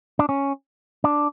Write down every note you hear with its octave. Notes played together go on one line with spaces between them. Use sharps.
D4
C#4
D4